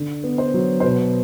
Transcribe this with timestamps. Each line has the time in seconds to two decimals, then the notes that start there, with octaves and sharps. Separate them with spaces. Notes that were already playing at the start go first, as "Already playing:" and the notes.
Already playing: D3
0.23 B3
0.38 C5
0.54 F#3
0.80 C5
0.83 B2 B4